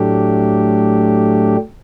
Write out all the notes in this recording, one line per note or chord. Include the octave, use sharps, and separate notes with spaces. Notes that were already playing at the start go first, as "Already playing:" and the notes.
Already playing: A2 F#3 A3 D4 G4